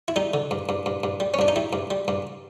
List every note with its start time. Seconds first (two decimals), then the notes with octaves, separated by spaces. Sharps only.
0.08 E4
0.16 G3 D#4
0.34 D3
0.51 G2
0.69 G2
0.86 G2
1.04 G2
1.20 G3
1.34 C#4
1.39 G2 D4
1.48 D#4
1.56 G3 E4
1.73 G2
1.91 G3
2.08 G2